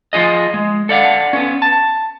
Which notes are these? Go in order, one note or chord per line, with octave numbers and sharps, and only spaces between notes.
F3 F4 G#4 D#5
G#3
A4 D5 F5 F#5
B3 C#4
A5